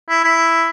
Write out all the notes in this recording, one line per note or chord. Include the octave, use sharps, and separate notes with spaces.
E4
E4